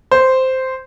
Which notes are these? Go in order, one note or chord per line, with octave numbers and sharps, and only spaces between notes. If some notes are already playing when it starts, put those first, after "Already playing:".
C5